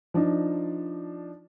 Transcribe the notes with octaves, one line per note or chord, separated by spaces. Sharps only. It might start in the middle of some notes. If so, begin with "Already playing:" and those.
F3 D4 D#4